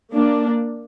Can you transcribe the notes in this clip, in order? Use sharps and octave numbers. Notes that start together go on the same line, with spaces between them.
A#3 D4